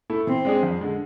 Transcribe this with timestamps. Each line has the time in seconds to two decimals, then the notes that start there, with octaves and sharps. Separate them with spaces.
0.10 A3 E4 A4
0.27 E3 C4
0.45 G#3 D4 G#4
0.63 F2
0.81 D3 G#3